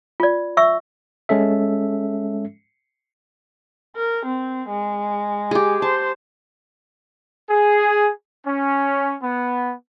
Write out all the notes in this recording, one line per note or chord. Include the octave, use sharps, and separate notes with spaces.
F4 D5
E5 C#6 E6
G#3 C#4 A4 E5
A#4
C4
G#3
G4 G#4
C5 A5
G#4
C#4
B3